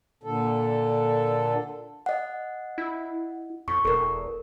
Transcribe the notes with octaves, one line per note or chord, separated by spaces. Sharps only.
A#2 D3 A4
D#5 F#5
E4
F2 C#6
E1 A4 A#4